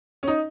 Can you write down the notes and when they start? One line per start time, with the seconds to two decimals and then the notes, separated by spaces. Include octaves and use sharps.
0.23 C#4
0.27 D#4